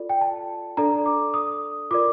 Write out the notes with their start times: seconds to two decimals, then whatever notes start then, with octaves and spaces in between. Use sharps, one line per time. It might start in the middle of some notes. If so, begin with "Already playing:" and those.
Already playing: F4 A4 D5
0.09 G5
0.21 A5
0.77 D4 A4 D5 A#5
1.06 D6
1.34 D#6
1.91 F4 A#4 D5 D6